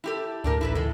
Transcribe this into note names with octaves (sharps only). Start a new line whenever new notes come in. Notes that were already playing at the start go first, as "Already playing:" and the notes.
E4 G4 A4
D2 A2 D4 G4 A#4
A1 E4 A4 B4
D2 C#3 E3 G#3 A4